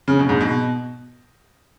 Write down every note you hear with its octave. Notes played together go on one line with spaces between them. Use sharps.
C#3
B2
G#2
B2